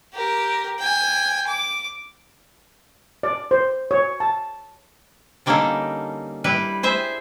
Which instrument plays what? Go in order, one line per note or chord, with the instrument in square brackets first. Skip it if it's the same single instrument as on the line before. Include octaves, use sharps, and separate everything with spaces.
[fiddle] G4 A#4
G5 G#5
D6
[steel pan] D5
C5
C#5
A5
[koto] D3 G3 A#3 C#4 D#4 A4
G3 E4 B4
G#4 C5 E5